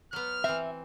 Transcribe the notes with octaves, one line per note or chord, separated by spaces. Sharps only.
F#3 B3 F6
E3 C4 E5